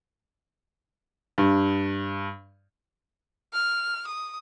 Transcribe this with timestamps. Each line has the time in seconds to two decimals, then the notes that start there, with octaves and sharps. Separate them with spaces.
1.38 G2
3.53 F6
4.07 D#6